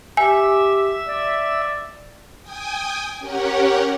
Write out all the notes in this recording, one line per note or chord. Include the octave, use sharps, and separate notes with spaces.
G4 E5 G#5
D5
G5 G#5 D#6
C#4 G4 A#4 C#5 F#5